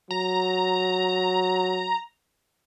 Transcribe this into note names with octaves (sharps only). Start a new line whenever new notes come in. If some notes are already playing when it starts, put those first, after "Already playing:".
F#3 A#5